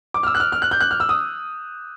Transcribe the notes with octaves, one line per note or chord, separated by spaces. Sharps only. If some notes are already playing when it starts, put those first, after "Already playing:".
D6
F6
E6
F#6
F6
F6
F#6
G6
F#6
F6
E6
D#6